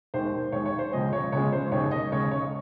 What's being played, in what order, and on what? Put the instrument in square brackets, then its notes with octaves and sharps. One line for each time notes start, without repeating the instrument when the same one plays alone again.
[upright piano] D#2 D#3 G#3 C5
D#2 D#3 G#3 C#5
C#5
C5
C#2 C#3 F3 G#3 D#5
C#5
C#2 C#3 F3 G#3 C#5
C5
D#2 C#3 G#3 C#5
D#5
D#2 C#3 G#3 C#5
C#5